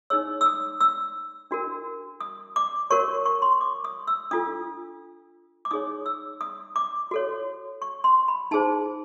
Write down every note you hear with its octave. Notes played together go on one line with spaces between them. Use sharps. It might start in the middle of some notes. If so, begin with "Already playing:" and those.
D#4 G#4 C#5 E6
E6
D#6
E6
D4 F#4 A#4
D#6
D6
F#4 A#4 C#5 C#6
C#6
C6
C#6
D6
D#6
E6
D4 F4 A4 D#6
D6
D#4 G#4 C#5 D#6
E6
D#6
D6
F#4 A4 C#5
C#6
C6
B5
D#4 G#4 C5 A5